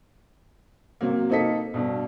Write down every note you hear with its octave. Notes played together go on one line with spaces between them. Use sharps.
C3 F#3 A#3
A#3 C4 D#4 A4 B6
G2 B2